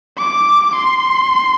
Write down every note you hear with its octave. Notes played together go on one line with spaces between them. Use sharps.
D6
C6